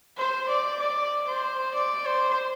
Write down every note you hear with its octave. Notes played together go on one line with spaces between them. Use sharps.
C5
D5
D5
C5
D5
C5